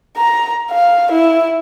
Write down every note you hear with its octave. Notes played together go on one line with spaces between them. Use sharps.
A#5
F5
E4